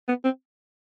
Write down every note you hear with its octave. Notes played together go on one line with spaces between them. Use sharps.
B3
C4